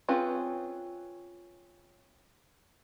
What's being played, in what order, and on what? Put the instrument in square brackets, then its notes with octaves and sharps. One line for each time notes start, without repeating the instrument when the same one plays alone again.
[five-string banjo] C4 C#4 F4 G#4 B4